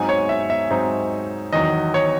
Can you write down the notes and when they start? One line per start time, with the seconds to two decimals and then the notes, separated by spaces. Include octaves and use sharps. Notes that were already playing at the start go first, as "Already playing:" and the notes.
Already playing: G#2 F#3 C4 D#4 G#5
0.09 C#5
0.29 E5
0.50 E5
0.71 G#2 F#3 C4 D#4
1.53 E2 D#3 F#3 D#5
1.94 C#5